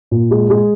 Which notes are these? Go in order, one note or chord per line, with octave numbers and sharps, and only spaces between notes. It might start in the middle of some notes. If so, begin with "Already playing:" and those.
A#2
G#3
G#3